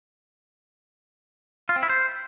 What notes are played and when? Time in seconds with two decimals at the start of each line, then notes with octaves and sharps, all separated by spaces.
1.69 F4
1.76 C4
1.83 E4
1.90 C5